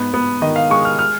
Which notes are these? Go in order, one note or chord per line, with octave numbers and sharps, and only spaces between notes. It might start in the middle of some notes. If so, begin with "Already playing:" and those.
Already playing: G#2 B3
B3
D#3 D#5
F5
G#3 C#6
F6
F6